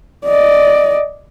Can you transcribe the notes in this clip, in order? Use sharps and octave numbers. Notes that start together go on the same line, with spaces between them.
D5 D#5